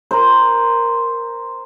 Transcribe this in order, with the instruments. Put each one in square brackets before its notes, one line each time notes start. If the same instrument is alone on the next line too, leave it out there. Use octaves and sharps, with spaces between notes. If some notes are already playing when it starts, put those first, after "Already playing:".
[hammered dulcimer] A#4 C5